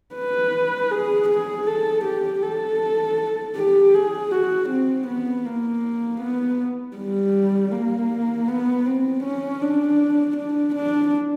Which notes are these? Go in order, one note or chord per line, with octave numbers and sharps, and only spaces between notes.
B4
G#4
G#4
A4
G4
A4
G4
G#4
F#4
C4
B3
A#3
B3
G3
A#3
B3
C4
C#4
D4
D4
D4